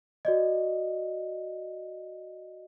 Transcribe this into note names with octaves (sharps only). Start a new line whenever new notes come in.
F#4 D5 D#5